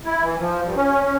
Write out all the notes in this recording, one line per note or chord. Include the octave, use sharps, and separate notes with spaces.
E4
E3
F3
G2
C#4
C#4